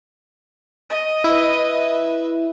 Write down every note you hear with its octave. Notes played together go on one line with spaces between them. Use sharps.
D#5
E4 B4 E5